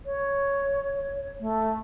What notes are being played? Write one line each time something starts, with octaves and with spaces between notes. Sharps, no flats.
C#5
A3